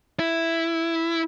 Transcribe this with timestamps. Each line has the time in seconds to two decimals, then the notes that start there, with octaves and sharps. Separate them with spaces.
0.19 E4